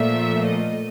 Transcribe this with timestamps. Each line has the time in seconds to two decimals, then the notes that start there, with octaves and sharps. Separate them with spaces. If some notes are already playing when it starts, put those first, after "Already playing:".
Already playing: A#2 F3 A3 E5
0.47 D#5